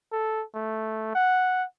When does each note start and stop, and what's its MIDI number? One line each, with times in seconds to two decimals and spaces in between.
0.12 0.43 69
0.55 1.10 57
1.15 1.64 78